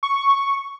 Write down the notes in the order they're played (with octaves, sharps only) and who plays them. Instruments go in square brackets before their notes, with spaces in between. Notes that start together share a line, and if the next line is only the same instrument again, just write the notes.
[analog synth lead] C#6